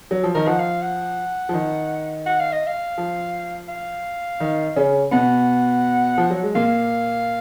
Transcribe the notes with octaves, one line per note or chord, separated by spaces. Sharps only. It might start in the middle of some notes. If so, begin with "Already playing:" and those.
F#3
F3
D#3 A#4
F3 F#5
F5
F#5
F3
D#3
F#5
F5
D#5
F5
F3
F5
D#3
C#3 C#4
B2 B3 F#5
F3
F#3
G#3
A#2 A#3 F5